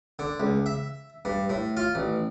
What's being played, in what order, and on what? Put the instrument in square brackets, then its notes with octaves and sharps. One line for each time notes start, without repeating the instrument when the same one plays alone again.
[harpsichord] D3
C#2
E5
G2
A2
F4
A1